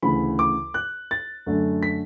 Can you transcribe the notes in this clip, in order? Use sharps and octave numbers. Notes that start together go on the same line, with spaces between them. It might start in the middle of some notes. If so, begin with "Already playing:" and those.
D2 C#3 E3 B5
D6
F#6
A6
F#2 D3 A3
B6